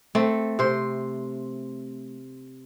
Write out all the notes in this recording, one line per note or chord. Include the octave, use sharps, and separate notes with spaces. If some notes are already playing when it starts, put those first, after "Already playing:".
A3 C4
C3 C5